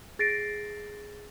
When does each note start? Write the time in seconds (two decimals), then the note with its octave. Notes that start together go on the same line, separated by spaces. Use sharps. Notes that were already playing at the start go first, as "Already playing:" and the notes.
0.19 G#4 A6 A#6 C7 D7